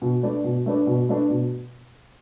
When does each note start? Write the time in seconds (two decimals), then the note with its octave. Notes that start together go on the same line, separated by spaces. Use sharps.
0.02 B2
0.23 A3 D4 B4 D5
0.44 B2
0.66 A3 D4 B4 D5
0.87 B2
1.09 A3 D4 B4 D5
1.30 B2